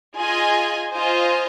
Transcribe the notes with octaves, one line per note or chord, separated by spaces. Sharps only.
F4 G#4 D#5 G#5
F4 C5 D#5 G#5